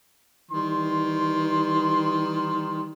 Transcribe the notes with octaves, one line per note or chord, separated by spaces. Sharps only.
D#3 E3 G3 C6